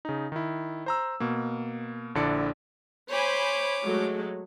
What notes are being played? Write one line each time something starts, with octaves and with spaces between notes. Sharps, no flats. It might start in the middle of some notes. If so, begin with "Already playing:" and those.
C#3 D#4
D#3 E4
C5 A#5 E6
B2 A#3
A#1 D3 D4 E4 D5 C#7
C5 C#5 G#5 B5 D6
F#3 G#3 A3